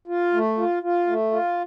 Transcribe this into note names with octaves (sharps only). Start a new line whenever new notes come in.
F4
A3
F4
F4
A3
F4